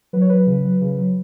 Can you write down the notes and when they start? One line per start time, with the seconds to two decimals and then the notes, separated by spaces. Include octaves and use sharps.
0.13 F#3 B4
0.21 C#5
0.29 F#3 B4
0.47 C#3
0.64 F#3
0.81 C#3
0.98 F#3